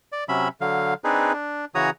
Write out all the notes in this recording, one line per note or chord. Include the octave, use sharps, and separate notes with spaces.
D5
C3 F#3 C#4 E5 B5
D3 F#3 F5
C4 D4 D#4 G#4 B4
D4
C#3 E3 F#4 C#5 A#5 D#6